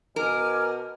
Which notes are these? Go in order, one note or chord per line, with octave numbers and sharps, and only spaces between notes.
B2 A#4 G#5 D6 F6